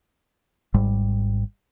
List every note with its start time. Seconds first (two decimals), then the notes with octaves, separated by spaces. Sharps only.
0.74 G#1 G#2 G3